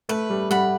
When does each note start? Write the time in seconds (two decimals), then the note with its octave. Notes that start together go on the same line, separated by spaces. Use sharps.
0.09 A3 B4
0.30 G3
0.50 G3 F#5 B5